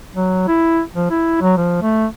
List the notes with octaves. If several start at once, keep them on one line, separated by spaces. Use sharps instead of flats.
F#3
E4
F3
E4
F#3
F3
A3